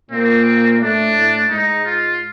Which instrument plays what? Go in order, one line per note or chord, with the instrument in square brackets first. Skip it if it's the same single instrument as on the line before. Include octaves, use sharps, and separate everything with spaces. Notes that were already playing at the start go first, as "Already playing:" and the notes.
[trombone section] A#2 A#3 [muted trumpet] C4
[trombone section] A2 A3 [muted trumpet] D4
[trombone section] A2 A3
[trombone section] G#2 G#3 [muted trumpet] D#4
[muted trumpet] F4